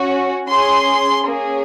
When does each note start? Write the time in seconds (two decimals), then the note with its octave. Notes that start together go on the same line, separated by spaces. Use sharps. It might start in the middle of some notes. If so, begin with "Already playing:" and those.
Already playing: C#4 F#4
0.47 C#4 G#4 C6
1.25 A#3 C#4 G#4